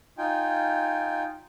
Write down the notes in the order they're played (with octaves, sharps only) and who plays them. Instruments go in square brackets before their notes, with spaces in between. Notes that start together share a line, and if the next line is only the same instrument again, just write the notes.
[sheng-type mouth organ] D#4 F4 G5 G#5